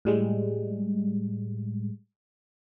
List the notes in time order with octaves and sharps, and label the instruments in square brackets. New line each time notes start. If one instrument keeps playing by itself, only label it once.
[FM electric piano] A2 G3 G#3